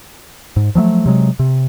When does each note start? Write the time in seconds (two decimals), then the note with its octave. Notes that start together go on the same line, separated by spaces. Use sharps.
0.56 G#2
0.75 F3 F#3 G#3 A3
1.06 C3 F#3 G#3
1.39 C3